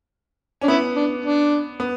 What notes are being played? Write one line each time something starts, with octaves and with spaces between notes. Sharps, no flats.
C#4 D4
B3 E4
D4
D4
B3